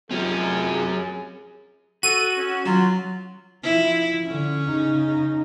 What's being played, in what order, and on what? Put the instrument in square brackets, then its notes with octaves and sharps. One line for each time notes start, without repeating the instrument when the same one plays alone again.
[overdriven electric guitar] F#2 C#4 [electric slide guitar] C4 F4 G4 [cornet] G#4
[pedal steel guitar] F#4 [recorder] A4 [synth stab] D#7
[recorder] C#4
[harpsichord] F#3 [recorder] F4
[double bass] F3 [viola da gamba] E4
[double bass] D3 [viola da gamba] C#4
[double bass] C#3 D#4